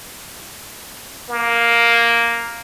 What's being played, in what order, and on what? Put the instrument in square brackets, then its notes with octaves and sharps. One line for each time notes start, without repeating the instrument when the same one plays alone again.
[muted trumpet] A#3